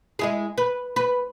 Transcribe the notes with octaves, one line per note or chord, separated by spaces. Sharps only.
G#3 E4 G#4
B4
B4